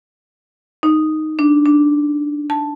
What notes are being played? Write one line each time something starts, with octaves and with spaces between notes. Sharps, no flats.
D#4
D4
D4
A5